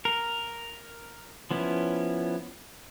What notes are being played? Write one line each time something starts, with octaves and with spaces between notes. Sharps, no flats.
A#4
F3 B3 C#4 E4